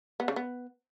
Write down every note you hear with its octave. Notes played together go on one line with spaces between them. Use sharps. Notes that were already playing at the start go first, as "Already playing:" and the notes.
B3
C#3
B3